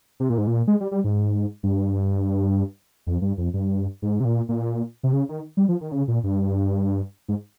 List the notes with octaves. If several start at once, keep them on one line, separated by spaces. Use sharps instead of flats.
C3
A#2
G#2
A#2
G#3
G3
G3
G#2
G2
F2
G2
F2
G2
G#2
C3
A#2
A#2
C3
C#3
D#3
G3
F3
D#3
C#3
A#2
G2
G#2